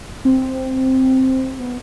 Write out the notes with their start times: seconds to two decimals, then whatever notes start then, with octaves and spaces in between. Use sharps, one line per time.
0.25 C4
1.59 B3